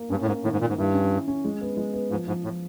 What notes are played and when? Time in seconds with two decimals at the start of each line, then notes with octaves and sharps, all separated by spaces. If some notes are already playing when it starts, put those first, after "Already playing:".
Already playing: A#3
0.10 G2 C#4
0.22 A2
0.27 G#2 A#3
0.44 A2 D#3
0.52 G#2
0.61 A#2 D#3
0.69 G#2
0.77 G2 E4
0.94 C#4
1.11 E4
1.28 C#4
1.45 G#3
1.61 B3
1.77 G#3
1.94 B3
2.10 G#2 F3
2.28 G#2 F3
2.44 A2 F3